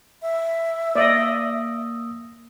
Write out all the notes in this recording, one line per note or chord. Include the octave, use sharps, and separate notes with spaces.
E5
A#3 D5 D#5 D#6 E6